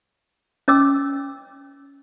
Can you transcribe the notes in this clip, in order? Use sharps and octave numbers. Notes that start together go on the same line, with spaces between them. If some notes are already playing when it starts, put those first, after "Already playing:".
C#4 D#5 D6 E6